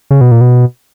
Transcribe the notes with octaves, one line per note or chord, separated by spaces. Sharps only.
C#3
B2
A#2
B2